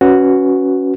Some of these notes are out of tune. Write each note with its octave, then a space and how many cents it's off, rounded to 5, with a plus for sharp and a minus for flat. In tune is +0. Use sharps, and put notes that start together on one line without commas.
C#4 +0 F#4 +0 B4 +0